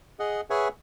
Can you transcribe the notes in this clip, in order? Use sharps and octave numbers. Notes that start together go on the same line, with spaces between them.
G#4 D#5 F#5
G#4 B4 C#5 E5 F#5 G#5